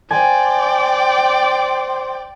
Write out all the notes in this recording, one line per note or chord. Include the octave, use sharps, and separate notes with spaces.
C5 D5 G5 G#5